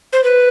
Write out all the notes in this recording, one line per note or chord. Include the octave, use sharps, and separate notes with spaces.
C5
B4